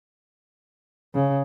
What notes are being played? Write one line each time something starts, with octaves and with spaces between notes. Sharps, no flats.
C#3